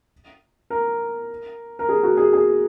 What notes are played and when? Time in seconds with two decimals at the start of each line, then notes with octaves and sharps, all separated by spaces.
0.70 A#4
1.79 A#4
1.89 G#4
2.03 F#4
2.17 G#4
2.33 G#4